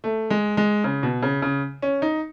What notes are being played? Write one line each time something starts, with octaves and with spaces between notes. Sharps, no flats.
A3
G#3
G#3
C#3
B2
C#3
C#3
C#4
D#4